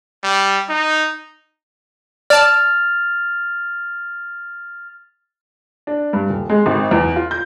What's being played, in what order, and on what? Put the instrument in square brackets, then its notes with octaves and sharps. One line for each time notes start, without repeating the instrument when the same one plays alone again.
[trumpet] G3
D#4
[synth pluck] D5 A5 [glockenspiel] F6 A6 F7
[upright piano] D4
G2
D#1
G#3
G#1
E2
F4
G6